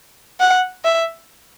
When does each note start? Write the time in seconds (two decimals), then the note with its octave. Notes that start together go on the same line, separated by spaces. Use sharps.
0.40 F#5
0.84 E5